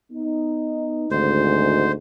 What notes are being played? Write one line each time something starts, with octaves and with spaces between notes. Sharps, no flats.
B3 D#4
G#1 D2 G#2 C5